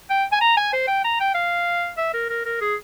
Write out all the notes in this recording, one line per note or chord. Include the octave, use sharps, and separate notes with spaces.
G5
G#5
A#5
G#5
C5
G5
A#5
G5
F5
E5
A#4
A#4
A#4
G#4